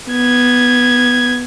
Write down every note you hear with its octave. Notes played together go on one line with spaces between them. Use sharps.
B3 G#6